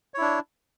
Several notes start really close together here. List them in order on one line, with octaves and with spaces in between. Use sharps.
C#5 E4 D4